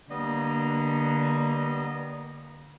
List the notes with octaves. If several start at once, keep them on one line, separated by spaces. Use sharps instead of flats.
D3 G3 A#3 B3 D#5